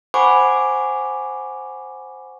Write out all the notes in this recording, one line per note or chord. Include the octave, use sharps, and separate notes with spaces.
C5 F#5 G#5 B5 C#6 D6